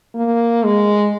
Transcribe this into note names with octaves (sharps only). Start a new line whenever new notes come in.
A#3
G#3